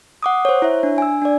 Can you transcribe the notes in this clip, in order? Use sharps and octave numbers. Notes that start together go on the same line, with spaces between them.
F#5 D6 D#6
C5 C#5
E4 C#5 E5
D4
G#5 E6
D4 D5